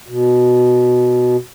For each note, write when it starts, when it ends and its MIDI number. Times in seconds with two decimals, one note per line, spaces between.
0.08 1.37 47